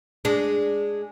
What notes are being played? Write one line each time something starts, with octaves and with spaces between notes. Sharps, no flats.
G#3 D4